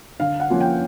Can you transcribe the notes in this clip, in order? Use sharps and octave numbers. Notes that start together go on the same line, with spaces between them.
D3 F5
F#5
F3 A#3 C#4 F4
G5